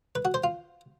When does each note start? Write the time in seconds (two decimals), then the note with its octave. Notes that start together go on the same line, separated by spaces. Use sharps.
0.15 B4
0.25 F#4
0.34 C5
0.44 F4